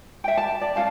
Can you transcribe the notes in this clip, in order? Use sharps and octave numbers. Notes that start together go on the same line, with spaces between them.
E5 G5
A5
D5
C#4 G4 F5 A5